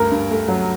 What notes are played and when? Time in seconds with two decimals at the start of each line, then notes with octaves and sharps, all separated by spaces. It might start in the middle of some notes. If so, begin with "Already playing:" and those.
Already playing: D2 G2 A#4
0.11 G2
0.31 A3
0.48 F#3